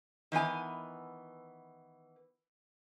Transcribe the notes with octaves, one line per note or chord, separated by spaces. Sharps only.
D#3 E3 B3 G#5